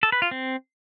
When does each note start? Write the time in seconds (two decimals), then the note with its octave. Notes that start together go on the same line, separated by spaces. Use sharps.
0.03 A4
0.12 B4
0.22 F4
0.31 C4